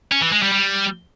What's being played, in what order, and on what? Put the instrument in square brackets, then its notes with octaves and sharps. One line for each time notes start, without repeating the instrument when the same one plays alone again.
[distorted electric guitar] C#4
E3
G#3
G3
G3